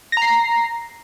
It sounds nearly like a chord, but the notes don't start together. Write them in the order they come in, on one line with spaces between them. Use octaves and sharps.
A#6 A#5 C7